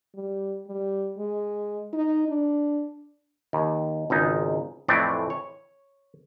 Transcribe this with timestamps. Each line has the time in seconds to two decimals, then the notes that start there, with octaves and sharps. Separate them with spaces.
0.15 G3
0.68 G3
1.18 G#3
1.93 D#4
2.29 D4
3.53 D#2
4.10 G#1 C#2 D#4
4.88 F2 A2 E3 A3 C4 D5
5.30 C#5